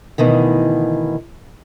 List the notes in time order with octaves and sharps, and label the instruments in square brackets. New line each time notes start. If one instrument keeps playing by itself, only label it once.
[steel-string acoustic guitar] D2 B2 D#3 E3